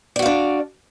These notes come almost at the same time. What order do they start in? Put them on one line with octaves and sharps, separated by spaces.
D5 F#4 F5 D4